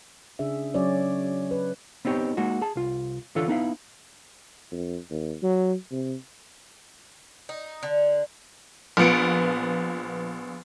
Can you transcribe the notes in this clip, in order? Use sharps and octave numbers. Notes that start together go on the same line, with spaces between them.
C#3 D4 G#4 E5
F#3 C#4 C#5 D5
B4
B3 C4 D#4 G4 C#5
G#3 A#3 D#4 F#4
G#4 A5
C2 F4
D3 E3 D4 F4 A4 C#5
B3 D#4 E4 F5
F2
D#2
F#3
C3
D#4
D3
A#1 F3 B3 C#7 D7